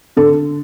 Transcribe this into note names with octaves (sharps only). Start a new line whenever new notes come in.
D3 A4